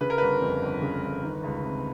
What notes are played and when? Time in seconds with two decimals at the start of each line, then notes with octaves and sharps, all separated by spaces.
0.01 C#3 B4
0.10 A#4
0.18 G1 B4
0.41 F2
0.62 G1
0.82 C#3
1.03 G1
1.23 D#3
1.44 C#2
1.64 C3